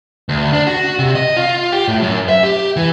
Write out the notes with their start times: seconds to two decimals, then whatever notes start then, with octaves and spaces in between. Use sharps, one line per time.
0.29 D2
0.53 D4
0.67 F#4
0.99 C3
1.15 D#5
1.37 F4
1.72 G4
1.88 A2
2.02 F#2
2.29 E5
2.43 G4
2.76 E3